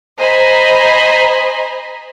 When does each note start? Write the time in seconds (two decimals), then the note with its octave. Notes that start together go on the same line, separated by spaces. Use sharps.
0.18 C5 D#5 G#5 A#5 B5